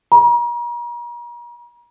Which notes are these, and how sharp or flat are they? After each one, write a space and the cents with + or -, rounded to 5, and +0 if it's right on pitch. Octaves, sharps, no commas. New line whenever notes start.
A#5 +40